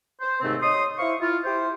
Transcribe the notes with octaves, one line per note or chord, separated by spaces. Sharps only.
C5
D#2 G#2 C3 A3 C4
C#5 D#5 C6 D#6
E4 C5 F5 C#6
E4 F4
E4 G4 C5